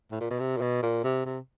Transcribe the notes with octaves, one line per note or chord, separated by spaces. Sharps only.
A2
A#2
B2
C3
A#2
B2
A#2
C3
C3